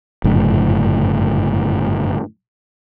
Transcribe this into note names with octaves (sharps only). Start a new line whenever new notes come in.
G1 F#2 A2 C#3